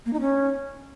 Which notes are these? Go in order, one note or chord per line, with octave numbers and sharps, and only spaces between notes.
A#3
D#4
C#4